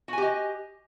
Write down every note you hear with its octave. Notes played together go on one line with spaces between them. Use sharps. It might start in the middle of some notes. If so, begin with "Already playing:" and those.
F#4 G4 D#5 G#5